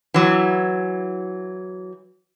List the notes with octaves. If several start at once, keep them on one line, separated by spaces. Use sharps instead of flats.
E3 F#3